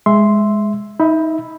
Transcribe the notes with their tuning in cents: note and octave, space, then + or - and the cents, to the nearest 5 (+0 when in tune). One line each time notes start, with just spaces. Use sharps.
G#3 +0 E5 +0 C6 +0
D#4 +25 E5 +0 B5 +0